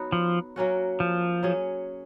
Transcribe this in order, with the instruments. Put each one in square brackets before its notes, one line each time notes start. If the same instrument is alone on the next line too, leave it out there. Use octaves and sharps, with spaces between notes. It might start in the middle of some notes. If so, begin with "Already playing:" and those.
Already playing: [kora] F#3 B3 D#4 F#4
[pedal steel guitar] F3
[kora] F#3 A#3 C#4 F#4
[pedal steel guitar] F3
[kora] F#3 C#4 G#4